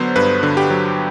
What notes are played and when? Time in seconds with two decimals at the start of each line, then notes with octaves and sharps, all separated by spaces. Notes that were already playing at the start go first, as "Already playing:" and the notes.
Already playing: D3 F#3 B3 C5
0.16 G2 B4
0.43 D3
0.57 G4
0.70 F#3